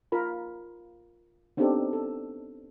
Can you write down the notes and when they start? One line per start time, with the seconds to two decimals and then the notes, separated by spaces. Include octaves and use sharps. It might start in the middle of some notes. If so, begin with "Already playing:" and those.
0.12 F4 A#4 B5
1.57 B3 C4 D4 D#4 G4 A4
1.93 A4